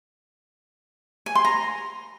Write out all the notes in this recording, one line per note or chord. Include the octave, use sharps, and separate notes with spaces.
G#5
C6
A#5